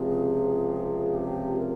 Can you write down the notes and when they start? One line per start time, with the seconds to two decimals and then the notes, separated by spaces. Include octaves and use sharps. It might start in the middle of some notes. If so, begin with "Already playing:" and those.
Already playing: C#2 C3 F3 G#4
1.15 G4
1.57 A#4